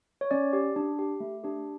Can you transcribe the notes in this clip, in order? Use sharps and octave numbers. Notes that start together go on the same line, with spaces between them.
C#5
C#4 D5
G4
D4
G4
A3
D4 G4